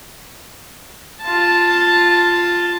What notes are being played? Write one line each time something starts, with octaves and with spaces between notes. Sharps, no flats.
F4 A5